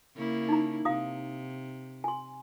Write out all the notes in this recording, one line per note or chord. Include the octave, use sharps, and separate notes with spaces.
C#3 A#3 E4
D#4 A#5
C3 F5 A#5 D#6
G#5 C6